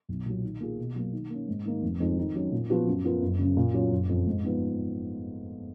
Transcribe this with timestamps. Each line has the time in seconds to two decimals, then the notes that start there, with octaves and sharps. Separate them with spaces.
0.09 B1
0.26 A#2 F#3
0.44 D#3
0.60 A#3 F4 G#4
0.78 B2
0.96 F#3 A#3
1.13 D#3
1.30 A#3 C#4
1.48 G#2
1.65 D#3 A#3 D#4
1.82 F1
2.00 F2 D#3 G#3 D#4
2.18 D#3
2.35 F#3 C#4
2.52 A#2
2.70 F3 B3 F#4 B4
2.87 F#2
3.04 F3 B3 F4 A#4
3.22 F#1
3.39 F#2 C#3
3.57 A#2
3.74 F#3 C#4 F4
3.91 F#1
4.09 F2 F3
4.27 G#2
4.44 F3 B3 D#4